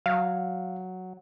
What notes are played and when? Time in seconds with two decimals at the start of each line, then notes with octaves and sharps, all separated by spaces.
0.06 F#3 F5